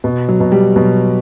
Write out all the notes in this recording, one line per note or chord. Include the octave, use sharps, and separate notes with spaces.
B2
F#3
B2
G3
B2 F#3